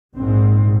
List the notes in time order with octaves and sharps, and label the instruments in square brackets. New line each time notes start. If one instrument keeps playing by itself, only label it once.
[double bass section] A#1 G#2 C4